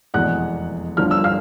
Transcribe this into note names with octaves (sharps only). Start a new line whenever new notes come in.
F1 E2 B2 G#3 F#5 F#6
G1 G2 D3 F3 F6
E6
F5 F6